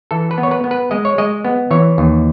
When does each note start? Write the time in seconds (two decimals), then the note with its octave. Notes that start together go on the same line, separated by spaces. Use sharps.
0.11 E3 A4
0.31 B4
0.38 B3
0.43 C#5
0.51 B4
0.64 B3
0.71 B4
0.91 G#3 D#5
1.05 C#5
1.18 G#3 D#5
1.45 B3
1.71 E3 C#5
1.98 D#2